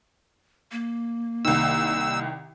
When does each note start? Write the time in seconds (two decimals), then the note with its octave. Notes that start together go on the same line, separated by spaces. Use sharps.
0.72 A#3
1.45 C2 D#3 E6